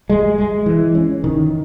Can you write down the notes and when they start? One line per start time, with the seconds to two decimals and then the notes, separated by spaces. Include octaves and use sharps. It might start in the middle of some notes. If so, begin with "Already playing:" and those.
0.10 G#3
0.38 G#3
0.66 E3
0.95 C#4
1.24 D#3